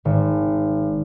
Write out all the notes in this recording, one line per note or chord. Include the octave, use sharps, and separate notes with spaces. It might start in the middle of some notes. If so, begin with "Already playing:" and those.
G#1